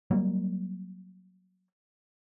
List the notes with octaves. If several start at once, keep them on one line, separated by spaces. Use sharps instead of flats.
F#3 G3 A#3